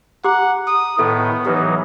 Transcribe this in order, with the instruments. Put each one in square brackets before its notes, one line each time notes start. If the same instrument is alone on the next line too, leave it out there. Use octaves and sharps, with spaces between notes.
[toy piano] G4 D6 [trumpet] F#5 [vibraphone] A#5
[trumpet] D#6
[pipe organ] A2 D#3 [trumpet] B3 [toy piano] A4 E5
[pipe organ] E3 F#3 D#4 [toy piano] G4 B4 C#5